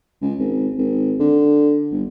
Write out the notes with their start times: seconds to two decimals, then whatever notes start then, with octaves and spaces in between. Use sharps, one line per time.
0.22 C#2
0.40 G#1
0.78 G#1
1.20 D3
1.92 G1